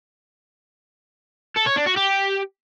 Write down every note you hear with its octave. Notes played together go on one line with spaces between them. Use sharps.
A4
C#5
D4
F#4
G4